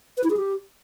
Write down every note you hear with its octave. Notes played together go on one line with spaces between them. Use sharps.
B4
E4
G#4
G4